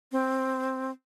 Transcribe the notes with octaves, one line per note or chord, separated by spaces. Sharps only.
C4